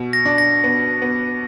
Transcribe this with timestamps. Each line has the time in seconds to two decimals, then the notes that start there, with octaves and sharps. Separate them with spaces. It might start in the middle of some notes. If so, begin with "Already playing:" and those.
Already playing: B2
0.13 A#6
0.25 D4
0.38 A#6
0.64 B3
1.02 B3